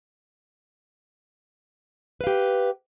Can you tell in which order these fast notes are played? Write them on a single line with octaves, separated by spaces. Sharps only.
B4 F5 G4